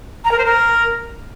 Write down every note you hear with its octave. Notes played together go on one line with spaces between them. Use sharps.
A#5
A#4
C5
A#4